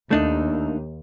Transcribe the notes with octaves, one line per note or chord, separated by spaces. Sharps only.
D#2 A3 D4 D#4